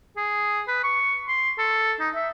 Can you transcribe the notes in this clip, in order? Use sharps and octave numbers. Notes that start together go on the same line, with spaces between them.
G#4
B4
C#6
C6
A4
D#4
E5